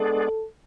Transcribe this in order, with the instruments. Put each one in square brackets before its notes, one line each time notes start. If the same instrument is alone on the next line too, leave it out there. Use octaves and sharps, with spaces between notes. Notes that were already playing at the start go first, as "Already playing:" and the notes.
Already playing: [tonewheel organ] G#3 B3 D4 G#4 D5 [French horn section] A4